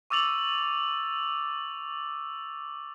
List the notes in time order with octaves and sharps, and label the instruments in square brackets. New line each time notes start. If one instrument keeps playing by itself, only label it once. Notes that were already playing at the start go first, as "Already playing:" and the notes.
[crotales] C#6 D6 E6 A6 F7 F#7